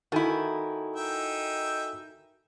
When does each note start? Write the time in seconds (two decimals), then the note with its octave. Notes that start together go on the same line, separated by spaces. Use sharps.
0.12 D#3 E4 F#4 A4 G#5
0.96 D#4 E5 G5